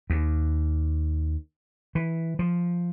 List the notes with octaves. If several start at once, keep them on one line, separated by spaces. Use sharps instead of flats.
D#2
E3
F3